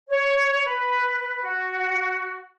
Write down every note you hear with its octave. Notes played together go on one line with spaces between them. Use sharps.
C#5
B4
F#4